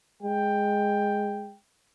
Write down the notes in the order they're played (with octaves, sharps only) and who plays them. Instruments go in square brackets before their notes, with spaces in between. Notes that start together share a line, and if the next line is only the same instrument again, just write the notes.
[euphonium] G#3 [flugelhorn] G5